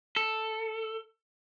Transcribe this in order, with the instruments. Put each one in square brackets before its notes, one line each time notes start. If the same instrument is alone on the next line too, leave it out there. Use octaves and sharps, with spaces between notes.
[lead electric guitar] A4